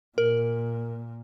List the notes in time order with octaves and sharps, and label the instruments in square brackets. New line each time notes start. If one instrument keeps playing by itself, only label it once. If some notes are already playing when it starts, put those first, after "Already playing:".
[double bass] A#2 [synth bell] A#4